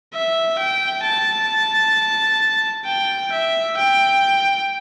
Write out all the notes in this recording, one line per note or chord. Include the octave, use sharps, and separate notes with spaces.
E5
G5
A5
G5
E5
G5